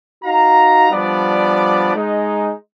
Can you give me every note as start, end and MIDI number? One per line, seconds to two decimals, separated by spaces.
0.25 0.90 63
0.25 0.90 66
0.25 0.90 77
0.25 0.90 82
0.92 1.92 53
0.92 1.92 55
0.92 1.92 59
0.92 1.92 62
0.92 1.92 74
1.95 2.52 56
1.95 2.52 63